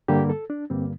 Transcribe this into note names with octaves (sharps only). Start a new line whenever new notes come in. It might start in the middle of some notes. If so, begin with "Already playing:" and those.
G2 D3 G3 A#3 G4
A4
D4
G2 D3 G3 A#3 C4